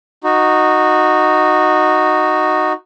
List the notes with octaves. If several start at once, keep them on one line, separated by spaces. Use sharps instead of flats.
D#4 F#4